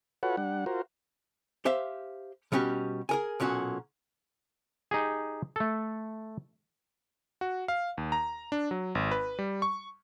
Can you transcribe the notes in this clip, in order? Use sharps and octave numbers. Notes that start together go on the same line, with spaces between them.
F4 F#4 A4 B4 C#5 F#5
G3 D4 F#5
F4 F#4 A#4 C5
G4 C5 E5 F5
B2 G3 C#4 F#4 G4
G#4 A#4 G#5
B1 A#2 C#4 F#4
D#4 G4 G#4
A3 A4
F#4
F5
D#2
A#5
D4
F#3
G#1
B4
G3
C#6